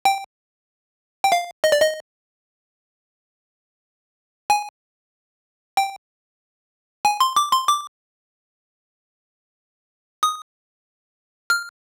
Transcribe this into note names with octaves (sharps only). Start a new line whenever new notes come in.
G5
G5
F5
D#5
D5
D#5
G#5
G5
G#5
C6
D6
C6
D6
D#6
F6